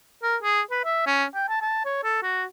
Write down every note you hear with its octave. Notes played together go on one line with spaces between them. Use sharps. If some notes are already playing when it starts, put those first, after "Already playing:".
A#4
G#4
B4
E5
C#4
G5
A5
A5
C#5
A4
F#4